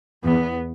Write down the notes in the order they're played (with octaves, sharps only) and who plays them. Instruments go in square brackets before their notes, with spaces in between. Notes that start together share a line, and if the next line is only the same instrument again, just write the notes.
[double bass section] E2 [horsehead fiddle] B3